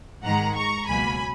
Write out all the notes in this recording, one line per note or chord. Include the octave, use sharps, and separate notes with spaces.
G#2 D#3 G#3 F#5 A#5
A#5 C#6
C#2 B2 F#3 A#3 G#5 B5